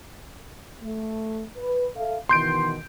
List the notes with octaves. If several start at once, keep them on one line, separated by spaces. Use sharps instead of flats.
A3
B4
A4 E5 F5
B2 D#3 E3 C6 G6 D7